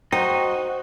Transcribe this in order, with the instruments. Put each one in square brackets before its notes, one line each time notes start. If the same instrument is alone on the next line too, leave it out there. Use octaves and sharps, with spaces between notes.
[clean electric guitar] D#4 [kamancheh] F#4 [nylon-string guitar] C5 [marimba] G5